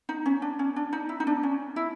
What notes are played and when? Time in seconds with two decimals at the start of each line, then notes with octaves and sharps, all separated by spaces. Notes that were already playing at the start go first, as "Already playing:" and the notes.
0.09 D#4
0.26 C#4
0.42 D4
0.59 C#4
0.76 D4
0.93 D#4
1.09 E4
1.20 D#4
1.27 D4
1.43 C#4
1.76 E4